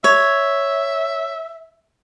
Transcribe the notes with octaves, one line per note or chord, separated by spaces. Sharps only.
C#5 E5